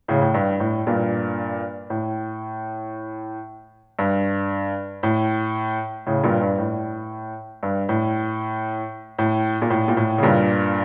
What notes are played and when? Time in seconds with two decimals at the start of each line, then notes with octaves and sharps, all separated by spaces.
0.08 A2 C#3
0.22 A2
0.34 G2
0.60 A2
0.87 G2 A#2
1.90 A2
3.99 G2
5.03 A2
6.06 A2 C#3
6.24 G2 A#2
6.41 G2
6.58 A2
7.63 G2
7.89 A2
9.19 A2
9.62 A#2
9.70 A2
9.88 A#2
9.97 A2
10.18 C#3
10.23 G2 A#2